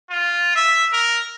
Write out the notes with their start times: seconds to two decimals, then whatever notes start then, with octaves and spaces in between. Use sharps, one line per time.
0.10 F4
0.56 E5
0.92 A#4